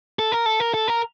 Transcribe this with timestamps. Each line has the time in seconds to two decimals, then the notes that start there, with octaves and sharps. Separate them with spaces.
0.19 A4
0.32 A#4
0.46 A4
0.60 A#4
0.74 A4
0.88 A#4